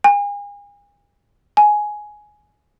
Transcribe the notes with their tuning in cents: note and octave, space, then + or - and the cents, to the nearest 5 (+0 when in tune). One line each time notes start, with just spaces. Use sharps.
G#5 -35
G#5 +10